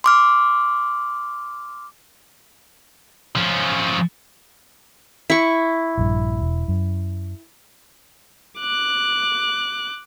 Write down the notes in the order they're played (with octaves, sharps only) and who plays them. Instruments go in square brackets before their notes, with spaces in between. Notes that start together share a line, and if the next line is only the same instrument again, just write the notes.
[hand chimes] C6 D6 F6
[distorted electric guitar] F3 C#4
[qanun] E4 C#6
[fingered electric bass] A#1 G2
E1
F#2
[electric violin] D6 F#6